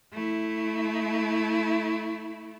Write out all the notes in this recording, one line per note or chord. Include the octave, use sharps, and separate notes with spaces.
A3 E4